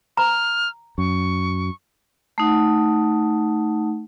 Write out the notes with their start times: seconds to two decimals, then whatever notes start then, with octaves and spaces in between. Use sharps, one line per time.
0.17 A#5 F6
0.98 F#2 C#6
2.38 A3 D#4 F#5